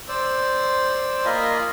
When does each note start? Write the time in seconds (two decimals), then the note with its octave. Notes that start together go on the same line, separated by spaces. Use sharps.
0.08 C5 D5 E6
1.25 A#3 F4 D#5 G#5 B5